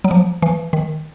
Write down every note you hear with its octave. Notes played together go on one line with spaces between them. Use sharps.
F#3
F3
E3
D#3